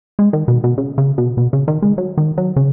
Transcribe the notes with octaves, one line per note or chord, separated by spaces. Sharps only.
G#3
D#3
B2
B2
C#3
C#3
B2
B2
C#3
D#3
G#3
F#3
D#3
F#3
C#3